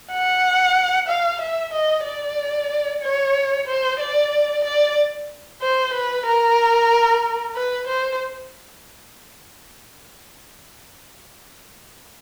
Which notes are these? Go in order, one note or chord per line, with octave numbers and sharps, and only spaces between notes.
F#5
F5
E5
D#5
D5
C#5
C5
D5
D5
C5
B4
A#4
B4
C5